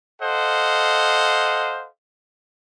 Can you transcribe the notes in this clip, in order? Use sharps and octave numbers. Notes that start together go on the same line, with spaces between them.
A4 C5 D#5 F5 F#5